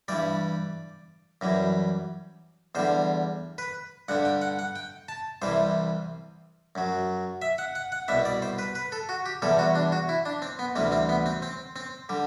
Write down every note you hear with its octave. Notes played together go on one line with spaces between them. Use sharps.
G2 E3 G3 D5
F#2 E3 G3
E2 D3 G3 C5
B4
G2 D3 G3 F#5
G5
F#5
F#5
G5
A5
C2 C3 E3 G3 C5
F#2 F#3
E5
F#5
F#5
F#5
C2 B2 G3 E5
D5
C5
B4
B4
A4
F#4
G4
E2 C3 E3 G3 A4
F#4
D4
F#4
E4
D4
C4
B3
D2 C3 E3 G3 C4
C4
B3
C4
C4
C4
D3 G3